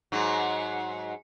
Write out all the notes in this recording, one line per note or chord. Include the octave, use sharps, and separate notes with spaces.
G#2 F#3